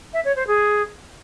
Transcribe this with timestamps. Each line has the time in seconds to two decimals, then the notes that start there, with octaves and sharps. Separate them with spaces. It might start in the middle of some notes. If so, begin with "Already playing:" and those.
0.13 E5
0.25 C#5
0.36 C5
0.47 G#4